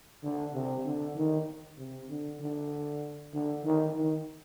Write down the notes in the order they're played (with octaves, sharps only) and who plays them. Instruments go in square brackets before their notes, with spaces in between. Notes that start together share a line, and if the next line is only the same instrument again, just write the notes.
[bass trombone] D3
C3
D3
D#3
C3
D3
D3
D3
D#3
D#3